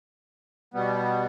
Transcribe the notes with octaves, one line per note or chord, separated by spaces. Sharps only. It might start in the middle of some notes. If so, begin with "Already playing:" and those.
B2 G3 B3